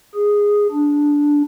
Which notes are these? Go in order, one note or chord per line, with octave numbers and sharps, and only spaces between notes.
G#4
D4